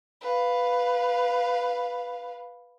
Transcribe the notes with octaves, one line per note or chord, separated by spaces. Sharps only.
B4 F5